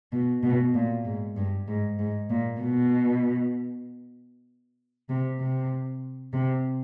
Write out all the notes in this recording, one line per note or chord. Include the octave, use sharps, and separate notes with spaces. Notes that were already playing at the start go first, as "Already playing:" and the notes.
B2
B2
A#2
G#2
G2
G#2
G#2
A#2
B2
C3
C3
C3